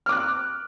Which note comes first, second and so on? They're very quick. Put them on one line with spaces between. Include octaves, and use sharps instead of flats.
F6 D6 F#6